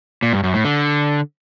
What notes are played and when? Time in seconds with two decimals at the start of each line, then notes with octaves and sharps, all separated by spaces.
0.23 A#2
0.33 G2
0.44 F#2
0.54 A2
0.65 D3